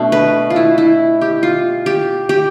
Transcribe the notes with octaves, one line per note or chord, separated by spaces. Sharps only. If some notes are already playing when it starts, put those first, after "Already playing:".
Already playing: B2 A3 D4
B4
F4
E4
E4
G4
F4
G4
G4